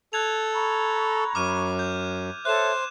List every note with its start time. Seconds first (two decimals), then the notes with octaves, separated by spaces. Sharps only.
0.13 A4 F#6 G#6 F7
0.54 A#5 B5 C#6
1.35 F#2 D6 F6 D#7
1.79 G6
2.45 A4 C5 C#5 E5 F#6 E7